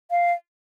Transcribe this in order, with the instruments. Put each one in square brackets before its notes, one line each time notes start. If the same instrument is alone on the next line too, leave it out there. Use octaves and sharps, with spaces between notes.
[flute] F5